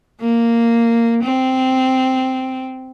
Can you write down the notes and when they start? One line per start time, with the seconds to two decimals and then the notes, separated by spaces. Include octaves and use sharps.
0.21 A#3
1.23 C4